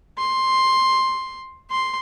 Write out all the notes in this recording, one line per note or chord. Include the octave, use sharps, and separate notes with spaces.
C6
C6